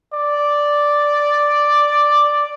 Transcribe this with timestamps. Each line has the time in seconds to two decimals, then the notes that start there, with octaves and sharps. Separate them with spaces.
0.13 D5